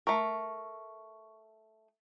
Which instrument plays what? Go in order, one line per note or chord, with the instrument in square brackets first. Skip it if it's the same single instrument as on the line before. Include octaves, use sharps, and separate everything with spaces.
[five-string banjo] A3 A#4 [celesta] C#6